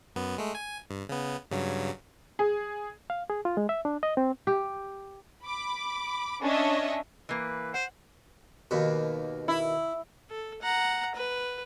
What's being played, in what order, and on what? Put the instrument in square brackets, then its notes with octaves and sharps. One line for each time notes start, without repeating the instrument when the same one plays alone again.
[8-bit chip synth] F#2 B3
G#3 A3
G#5
G2
C#3 B3
G2 C#3 F#3
[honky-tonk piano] G#4
[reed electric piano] F5
G#4
F4
G#3
E5
D4
D#5
C4
[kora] G4
[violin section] B5 D6
C#4 D4 C#5 D#5 E5
[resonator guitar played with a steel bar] E3 A#3 [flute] B4
[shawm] C5 [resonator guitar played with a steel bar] F#5
[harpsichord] D#2 B2
[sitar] E4
[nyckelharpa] A4
F#5 A#5
B4